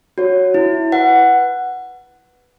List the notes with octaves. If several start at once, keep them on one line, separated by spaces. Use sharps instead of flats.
F#4 C#5
E4
B4 F#5